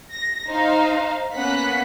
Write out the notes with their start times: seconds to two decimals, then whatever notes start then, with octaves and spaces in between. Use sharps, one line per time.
0.12 A#6
0.49 D#4 C5 F5
1.35 A#3 B3 C#4 F#5 F#6 B6